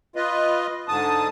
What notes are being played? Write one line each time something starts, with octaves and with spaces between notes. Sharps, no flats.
F4 B4 D#5
G#2 D3 A5 D#6